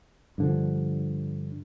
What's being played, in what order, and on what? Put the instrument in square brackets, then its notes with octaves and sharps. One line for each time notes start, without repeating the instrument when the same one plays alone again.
[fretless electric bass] G2 D3 F3